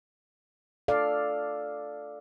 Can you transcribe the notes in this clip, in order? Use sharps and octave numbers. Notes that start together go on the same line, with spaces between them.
A4 D5 F5